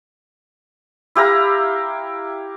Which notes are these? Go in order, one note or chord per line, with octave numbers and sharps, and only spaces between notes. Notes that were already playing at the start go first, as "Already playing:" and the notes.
E4 G4 F5 A#5